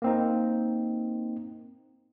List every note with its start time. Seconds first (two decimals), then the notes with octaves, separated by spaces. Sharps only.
0.02 A#3 C4 D#4